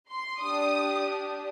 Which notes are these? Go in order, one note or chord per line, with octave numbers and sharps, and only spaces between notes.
C6
D4 G4 D#6